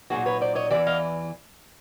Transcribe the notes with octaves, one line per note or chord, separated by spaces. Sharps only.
A#2 F#3 B3 D#4 F#4 G#4
B4 C#5
C5 D5
C#5 D#5
E2 C#3 E3 D5 E5
D#5 F5